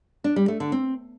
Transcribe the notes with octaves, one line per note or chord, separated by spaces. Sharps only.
D4
G3
A3
D3
C4